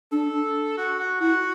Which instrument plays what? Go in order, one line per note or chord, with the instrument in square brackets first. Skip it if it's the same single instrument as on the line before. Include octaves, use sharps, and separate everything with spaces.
[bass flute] D4 [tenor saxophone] A4
[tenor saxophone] F#4
F#4
[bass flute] E4 [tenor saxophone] F#4